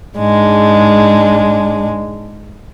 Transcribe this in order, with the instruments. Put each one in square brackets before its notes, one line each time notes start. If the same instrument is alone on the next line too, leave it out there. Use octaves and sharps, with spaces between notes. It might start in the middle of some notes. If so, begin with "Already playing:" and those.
[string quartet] G#2 G#3 D4